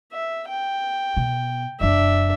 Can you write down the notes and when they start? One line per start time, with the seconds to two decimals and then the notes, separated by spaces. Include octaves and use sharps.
0.12 E5
0.48 G5
1.17 B2
1.80 F1 F#2 D4 E5